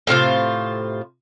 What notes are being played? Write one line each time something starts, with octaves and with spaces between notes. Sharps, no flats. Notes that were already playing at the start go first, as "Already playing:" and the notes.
A2 C3 F4 C5